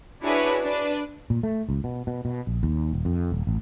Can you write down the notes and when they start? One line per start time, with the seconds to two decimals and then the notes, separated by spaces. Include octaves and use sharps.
0.23 D4 E4 F#4 G#4 B4 C#5
0.62 D4 B4
1.30 A#2
1.43 A3
1.69 C#2
1.84 B2
2.07 B2
2.25 B2
2.47 A#1
2.63 D#2
2.93 D#1
3.05 F2
3.32 D#1
3.47 A1